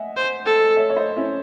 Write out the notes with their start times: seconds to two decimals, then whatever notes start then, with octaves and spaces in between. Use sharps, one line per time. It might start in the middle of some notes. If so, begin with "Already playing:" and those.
Already playing: D#5 E5 F#5 G#5
0.17 C5
0.46 A4
0.76 C#5 E5
0.90 C#5
0.96 C5 D#5
1.16 C#4 E4